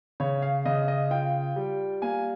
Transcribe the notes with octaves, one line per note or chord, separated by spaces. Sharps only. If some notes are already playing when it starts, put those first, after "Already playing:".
C#3 C#5
F5
C#3 D#5
D#5
F4 G5
G3
A#3 G#5